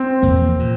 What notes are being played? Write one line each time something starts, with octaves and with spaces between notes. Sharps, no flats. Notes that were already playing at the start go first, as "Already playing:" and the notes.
Already playing: C4
E2 C3 F3 A#3
A#2